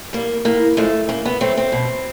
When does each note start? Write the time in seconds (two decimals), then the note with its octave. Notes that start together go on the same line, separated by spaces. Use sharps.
0.13 G3 A#3
0.45 A2 A#3
0.77 F3 G#3 A3
1.09 C#3 A#3
1.25 B3
1.41 F#3 A3 C4
1.57 C4
1.72 B2